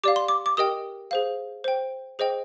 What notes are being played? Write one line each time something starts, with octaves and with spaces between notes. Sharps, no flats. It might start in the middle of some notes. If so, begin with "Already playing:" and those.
G4 D5 F5 D6
C6
D6
D6
G4 A#4 D#5 G5 D#6
G#4 C5 F5
C5 G5
G#4 C5 D#5 G5